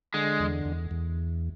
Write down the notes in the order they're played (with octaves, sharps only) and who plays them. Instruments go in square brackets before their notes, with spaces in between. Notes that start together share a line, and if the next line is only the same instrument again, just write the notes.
[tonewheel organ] D3 [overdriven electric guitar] G#3
[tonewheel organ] E2
E2
E2